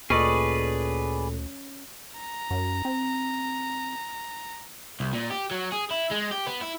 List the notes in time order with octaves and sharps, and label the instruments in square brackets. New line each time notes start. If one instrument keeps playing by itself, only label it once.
[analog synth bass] D2 [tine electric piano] A#2 A4 [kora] C#4 D#5 [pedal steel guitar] G#4 B4 D5
[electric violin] A#5
[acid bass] F#2
C4
[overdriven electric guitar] C2
A#2
G4
F#3
G#4
E4
G#3
G4
B3
E4